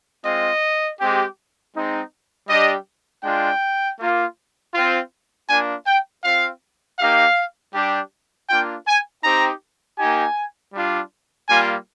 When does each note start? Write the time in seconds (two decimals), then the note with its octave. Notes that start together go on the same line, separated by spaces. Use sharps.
0.24 G#3 C4 F4 D#5
1.00 G#3 C4 G4
1.75 G#3 C4 D#4
2.49 G3 D4 G4 D#5
3.24 G#3 D4 F4 G5
3.99 A#3 F4
4.74 C4 F4
5.49 A#3 D4 F4 G#5
5.86 G5
6.24 C4 F4 F5
6.99 A#3 D#4 G4 F5
7.74 G3 D4 G4
8.49 A#3 D4 F4 G5
8.87 G#5
9.24 C4 D#4 G4 A#5
9.99 A#3 D#4 G4 G#5
10.74 G3 D4 F4
11.49 G3 A#3 F4 G#5